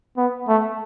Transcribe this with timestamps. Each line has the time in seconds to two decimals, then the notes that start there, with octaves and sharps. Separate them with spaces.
0.17 B3
0.48 A3